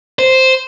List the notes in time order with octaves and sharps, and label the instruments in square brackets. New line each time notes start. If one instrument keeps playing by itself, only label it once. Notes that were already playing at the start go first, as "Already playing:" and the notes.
[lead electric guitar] C5